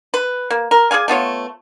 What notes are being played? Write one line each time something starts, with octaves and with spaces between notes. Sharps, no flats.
B4
A#3
A#4
G#4 D5 F5 G#5
A3 B3 F4 C#5